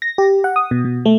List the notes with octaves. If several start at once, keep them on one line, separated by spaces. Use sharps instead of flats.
A#6
G4
F#5
D#6
B2
B2
A3